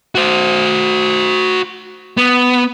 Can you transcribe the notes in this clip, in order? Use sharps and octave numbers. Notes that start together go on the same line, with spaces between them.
F#4 C5
B3